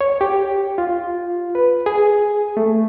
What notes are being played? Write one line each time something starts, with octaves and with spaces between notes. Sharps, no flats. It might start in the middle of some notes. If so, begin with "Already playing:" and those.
C#5
G4
F4
B4
G#4
A3